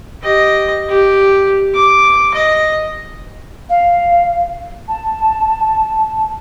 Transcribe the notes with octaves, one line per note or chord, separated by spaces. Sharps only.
G4 D#5
G4
D6
D#5
F5
A5